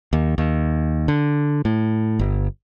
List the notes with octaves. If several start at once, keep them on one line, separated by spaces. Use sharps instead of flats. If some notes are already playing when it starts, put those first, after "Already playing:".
D#2
D#2
D3
A2
G1